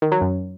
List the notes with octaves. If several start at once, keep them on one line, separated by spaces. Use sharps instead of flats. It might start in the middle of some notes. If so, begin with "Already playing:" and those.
D#3
F#3
F#2